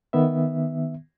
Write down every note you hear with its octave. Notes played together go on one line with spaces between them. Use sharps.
D#3 B3 E5